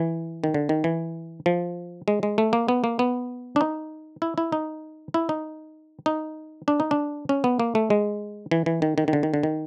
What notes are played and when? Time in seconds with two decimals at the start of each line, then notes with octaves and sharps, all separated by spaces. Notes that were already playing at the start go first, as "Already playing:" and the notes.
Already playing: E3
0.44 D#3
0.54 D3
0.69 D#3
0.84 E3
1.46 F3
2.08 G#3
2.23 G#3
2.38 A3
2.53 A#3
2.68 B3
2.84 A#3
2.99 B3
3.56 D4
3.61 D#4
4.22 E4
4.38 E4
4.52 D#4
5.14 E4
5.29 D#4
6.06 D#4
6.68 D4
6.80 D#4
6.91 D4
7.29 C#4
7.44 B3
7.60 A#3
7.75 A3
7.90 G#3
8.51 E3
8.66 E3
8.82 D#3
8.98 D#3
9.08 D#3
9.13 D3
9.23 D#3
9.34 D3
9.43 D#3